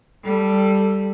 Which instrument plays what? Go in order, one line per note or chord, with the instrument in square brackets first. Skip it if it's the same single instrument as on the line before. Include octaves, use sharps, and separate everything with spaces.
[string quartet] G3 [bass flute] A4